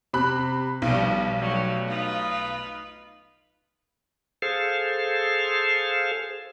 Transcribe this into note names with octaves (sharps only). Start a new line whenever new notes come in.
C3 B5 F#6
B1 B2 F3 G3
F#3 G3 A3
D#4 F4 B4
G#4 A4 C5 F5